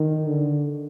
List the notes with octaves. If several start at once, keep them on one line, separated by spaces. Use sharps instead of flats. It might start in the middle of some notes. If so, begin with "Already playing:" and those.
Already playing: D#3
D3